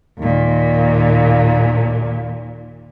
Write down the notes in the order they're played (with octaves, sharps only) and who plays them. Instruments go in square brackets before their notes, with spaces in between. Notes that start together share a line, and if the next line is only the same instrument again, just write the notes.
[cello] D#2 A#2